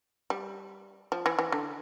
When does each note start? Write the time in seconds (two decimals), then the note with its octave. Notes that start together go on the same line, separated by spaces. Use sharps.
0.30 G3
1.12 F3
1.26 E3
1.39 E3
1.52 D3